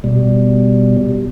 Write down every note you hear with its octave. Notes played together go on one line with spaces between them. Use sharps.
B2 G3